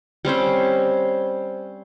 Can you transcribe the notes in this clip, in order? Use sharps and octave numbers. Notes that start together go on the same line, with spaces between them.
G3 C4 C#4 C5